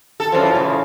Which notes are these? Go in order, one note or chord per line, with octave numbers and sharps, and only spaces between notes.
A4
F#2 E3 F3
A2 C#3